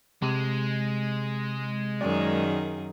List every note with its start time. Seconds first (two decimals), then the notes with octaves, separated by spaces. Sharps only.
0.22 C3 G#3
2.01 F#2 D#3 G#4 D5